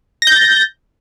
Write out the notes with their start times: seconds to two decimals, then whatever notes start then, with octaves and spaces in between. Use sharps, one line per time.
0.22 A#6
0.27 G6
0.32 A6